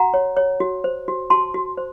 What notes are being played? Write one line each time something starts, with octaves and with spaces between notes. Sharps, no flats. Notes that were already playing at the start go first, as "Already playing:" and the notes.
Already playing: F#4 F#5 A#5
C#5
C#5
F#4
C5
F#4
F#4 A5 C6
F#4
C5